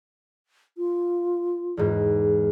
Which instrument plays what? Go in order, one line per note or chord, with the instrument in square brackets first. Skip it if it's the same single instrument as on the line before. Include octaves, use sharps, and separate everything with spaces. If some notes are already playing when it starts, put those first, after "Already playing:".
[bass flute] F4
[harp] E2 G#2